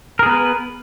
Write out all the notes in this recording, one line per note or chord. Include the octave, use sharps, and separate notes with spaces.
B3 G#4 A#4 B4